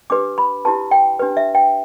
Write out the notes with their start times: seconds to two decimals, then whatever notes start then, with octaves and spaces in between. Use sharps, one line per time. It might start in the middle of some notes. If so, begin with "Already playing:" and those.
0.10 D4 G4 B4 D6
0.38 B5
0.65 E4 G4 B4 A5
0.91 G5
1.19 D4 G4 B4
1.37 E5
1.55 G5